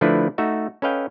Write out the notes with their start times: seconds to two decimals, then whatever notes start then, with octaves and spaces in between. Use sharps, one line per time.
0.01 D3 F3 A3 D4 E4 B4
0.38 A3 D#4 F#4 E5
0.82 C#4 A4 B4 D#5 F5 G5